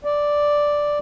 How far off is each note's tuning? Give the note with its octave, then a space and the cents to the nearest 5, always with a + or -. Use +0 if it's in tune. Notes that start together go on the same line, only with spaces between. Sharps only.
D5 +0